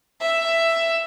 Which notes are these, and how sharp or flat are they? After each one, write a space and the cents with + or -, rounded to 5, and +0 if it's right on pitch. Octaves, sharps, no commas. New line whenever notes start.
E5 +10